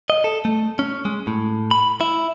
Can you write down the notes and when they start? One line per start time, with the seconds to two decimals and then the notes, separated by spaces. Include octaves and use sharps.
0.10 D#5
0.24 A4
0.45 A3
0.79 C#4
1.05 G#3
1.27 A2
1.71 B5
2.01 E4